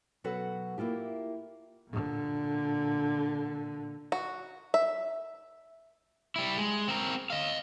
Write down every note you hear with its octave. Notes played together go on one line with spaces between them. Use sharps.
B2 F#3 F#4 A4 B4 F#5
A#3 E4 F4 G4
A#2 D3
F#4
E5
G3 E4
G#3
C4 A#4
D#5 F5